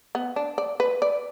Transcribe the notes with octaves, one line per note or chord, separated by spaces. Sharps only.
B3
D4
D5
B4
D5